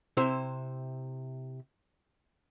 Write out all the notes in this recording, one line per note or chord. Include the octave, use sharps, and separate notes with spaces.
C3 E4 C5